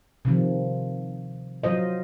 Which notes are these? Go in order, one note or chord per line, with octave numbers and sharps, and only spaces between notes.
C3 D#3 F3
F#3 F4 C5 D#5